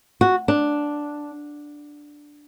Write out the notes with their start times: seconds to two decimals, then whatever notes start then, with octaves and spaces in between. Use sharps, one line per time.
0.21 F#4
0.48 D4